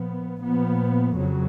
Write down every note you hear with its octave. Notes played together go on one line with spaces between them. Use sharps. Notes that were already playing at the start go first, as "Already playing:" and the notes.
Already playing: A#2 F3 B3
A#2 F3 B3
F2 C#3 F#3